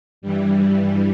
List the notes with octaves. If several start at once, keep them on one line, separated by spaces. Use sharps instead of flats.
G2 E3 G3